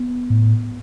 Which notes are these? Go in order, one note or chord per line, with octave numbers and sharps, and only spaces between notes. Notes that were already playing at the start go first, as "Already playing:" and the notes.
Already playing: B3
A2